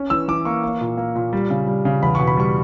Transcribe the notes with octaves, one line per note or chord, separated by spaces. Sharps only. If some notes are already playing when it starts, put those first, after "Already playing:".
Already playing: C#4
E3 E6
E3 D6
A#3 C#6
A#3
A#2
A#3
A#2
G3
C#3
G3
C#3
E2 B5
B2 C#6
B5
G3 C#6